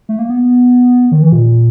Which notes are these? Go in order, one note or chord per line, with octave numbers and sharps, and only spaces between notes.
A3
A#3
B3
D#3
E3
A#2